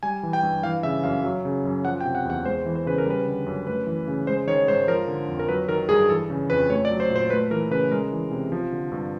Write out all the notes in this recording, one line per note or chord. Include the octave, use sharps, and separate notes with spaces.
G3 G#5
E3
G5
G2
E3 F5
C#3 E5
F#2 F5
F#3
C#3
F#2
F3 F#5
G5
C3
F#5
E2 F#5
G#3 C5
E3
C5
C#3 B4
A#4
G3 B4
D3
F#2
A3 B4
E3
C#3
G#3 C5
D#3 C#5
G#2 C5
F3 A#4
D3
F2
A#4
F#3 B4
D#3 A#4
G2 G#4
E3 A4
C#3
F2 B4
A3 C#5
D5
F#3
C5
A#2
C5
A3 B4
E3 A#4
C#3 B4
G#3 A#4
E3
C3
F3
D3
G2